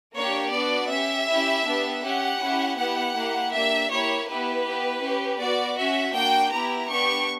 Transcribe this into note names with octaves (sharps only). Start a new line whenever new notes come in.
A#3 D4 G4 C#5
B3 D4 F#4 D5
C#4 G4 E5
C#4 E4 G4
B3 D4 G4
C#4 G4 F#5
C#4 E4 G4
B3 E4 G4 F#5
A#3 E4 G4
A#3 D4 G4 E5
A#3 E4 G4 C#5
B3 E4 G4 B4
B3 E4 G4
C#4 G4
B3 F#4 D5
C#4 F#4 E5
A#3 D4 F#4 G5
B3 E4 G4 A#5
B3 D4 G4 C#6